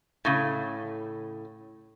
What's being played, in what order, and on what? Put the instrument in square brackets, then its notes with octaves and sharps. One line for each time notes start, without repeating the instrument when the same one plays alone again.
[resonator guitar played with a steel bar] A2 C#3